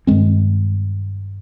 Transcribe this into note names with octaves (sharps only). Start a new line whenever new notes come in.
G2 D#3 G#3 C4